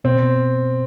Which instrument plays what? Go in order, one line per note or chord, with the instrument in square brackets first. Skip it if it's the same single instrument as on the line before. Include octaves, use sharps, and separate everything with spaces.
[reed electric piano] B2 [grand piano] C4